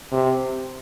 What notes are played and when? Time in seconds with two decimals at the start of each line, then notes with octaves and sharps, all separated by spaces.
0.12 C3